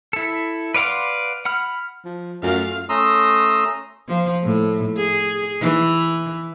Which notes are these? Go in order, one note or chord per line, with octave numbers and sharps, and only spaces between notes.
E4 A4
B4 D5 F5 F#5 C6
F#5 B5 F6
F3
F#2 A3 F4 F5
A3 C#4 A#5 C6 D#6 E6
F3
A2
G#4
E3